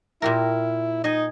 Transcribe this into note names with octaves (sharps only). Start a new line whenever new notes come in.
A#2 E4 G4 A#4
D#4 D#5 G#5